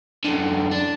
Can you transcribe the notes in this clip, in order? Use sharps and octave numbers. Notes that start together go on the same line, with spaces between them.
F#2 D3
D4